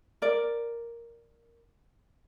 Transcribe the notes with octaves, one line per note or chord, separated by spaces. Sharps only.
A#4 D5